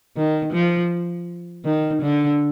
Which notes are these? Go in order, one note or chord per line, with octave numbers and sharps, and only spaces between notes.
D#3
F3
D#3
D3